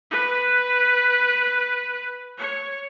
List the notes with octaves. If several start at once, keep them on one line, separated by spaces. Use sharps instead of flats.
B4
C#5